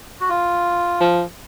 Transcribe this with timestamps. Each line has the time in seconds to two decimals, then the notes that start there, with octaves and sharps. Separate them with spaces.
0.21 F#4
0.29 F4
1.00 F3